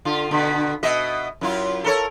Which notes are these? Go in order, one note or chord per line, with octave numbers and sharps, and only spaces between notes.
D3 F4
B2 D3
B2 D#5 E5
F#2 E4 F4
A4 A#4 C#5